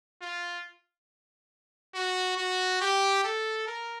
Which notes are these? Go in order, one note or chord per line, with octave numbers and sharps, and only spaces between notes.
F4
F#4
F#4
G4
A4
A#4